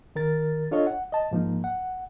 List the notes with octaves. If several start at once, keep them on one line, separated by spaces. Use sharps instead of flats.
D#3 A#4 A6
D4 F4 A4 C#5 D#5
F#5
D#5 A5
G#2 F3 A#3 D#4
F#5